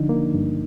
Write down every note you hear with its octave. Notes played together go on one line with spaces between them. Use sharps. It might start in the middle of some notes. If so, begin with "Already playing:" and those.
Already playing: D3 F3 D4 D#4
A#3
G2